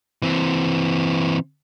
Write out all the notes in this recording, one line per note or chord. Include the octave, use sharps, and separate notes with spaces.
E3 C4